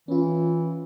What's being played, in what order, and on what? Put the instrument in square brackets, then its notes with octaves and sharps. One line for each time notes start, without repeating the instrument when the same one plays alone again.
[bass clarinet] E3 [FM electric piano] C#4 F4